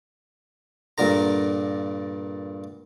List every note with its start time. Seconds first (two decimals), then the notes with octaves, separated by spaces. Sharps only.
0.98 G2 A#2 D3 A#4 A#5